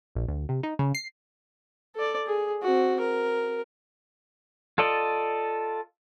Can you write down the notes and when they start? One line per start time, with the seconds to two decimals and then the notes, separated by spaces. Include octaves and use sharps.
0.15 A#1
0.28 D2
0.49 C3
0.63 D#4
0.79 C#3
0.95 C7
1.95 A4 D5
2.27 G#4
2.63 C4 F#4
3.00 A#4
4.78 F4 A4 D5 D#5